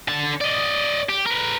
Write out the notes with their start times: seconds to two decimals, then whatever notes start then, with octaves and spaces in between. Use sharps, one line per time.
0.08 D3 A5
0.41 D5 D#5
1.09 G4
1.26 A#4 B4